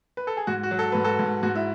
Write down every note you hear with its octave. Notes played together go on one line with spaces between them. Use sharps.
B4
A4
G#4
G#2 F#4
F#4
F#3
A4
G#2 B4
F#4 A4
G#2
G#2 F#4
E4